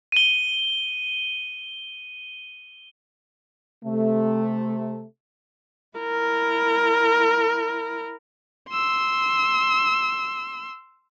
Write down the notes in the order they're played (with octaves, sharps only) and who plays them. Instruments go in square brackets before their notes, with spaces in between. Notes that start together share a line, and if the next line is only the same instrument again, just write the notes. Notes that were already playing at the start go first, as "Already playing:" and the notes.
[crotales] D#7 G7
[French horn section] C3 A3
[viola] E4 A#4
[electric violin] C6 E6